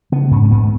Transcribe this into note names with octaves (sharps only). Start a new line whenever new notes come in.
C#3 B3
G#2 C#4
C#4
G#2 B3